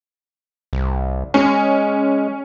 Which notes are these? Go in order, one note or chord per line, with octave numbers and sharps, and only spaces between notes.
C2
G#3 C#4